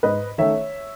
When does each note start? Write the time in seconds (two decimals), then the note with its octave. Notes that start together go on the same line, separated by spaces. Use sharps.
0.03 G#2 B4 D#5
0.38 D#3 A3 C#4 C#5 E5